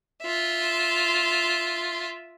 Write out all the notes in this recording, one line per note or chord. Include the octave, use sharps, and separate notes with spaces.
F4 E5